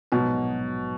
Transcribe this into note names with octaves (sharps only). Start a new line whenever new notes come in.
A#1 G#2 B2 F#3 B3